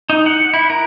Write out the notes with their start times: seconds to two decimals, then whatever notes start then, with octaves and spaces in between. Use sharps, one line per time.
0.10 D#4
0.26 F#5
0.54 E4
0.70 A#4